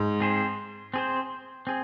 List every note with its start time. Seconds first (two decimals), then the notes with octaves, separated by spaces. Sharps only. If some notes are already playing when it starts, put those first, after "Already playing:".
Already playing: G#2
0.20 C4 G#4 C5
0.94 C4 G#4 C5
1.67 C4 G#4